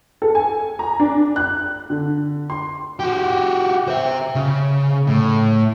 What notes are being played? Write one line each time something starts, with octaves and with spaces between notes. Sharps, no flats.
A4
G#5
A#5
D4
F#6
D3
C6
F#4 G4
C5 E5
C#3
A2